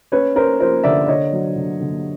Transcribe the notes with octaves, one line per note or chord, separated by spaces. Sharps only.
C#4 B4 C#5
C#4 A#4 C5
F3 A#4 C5
D3 D5 E5
D3 C#5 D#5
F#3
D3
D3